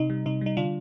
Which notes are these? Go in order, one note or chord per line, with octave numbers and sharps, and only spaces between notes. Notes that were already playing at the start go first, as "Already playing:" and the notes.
Already playing: C3 D#4
G3
C3 D#4
G3 D#4
D3 D4 F4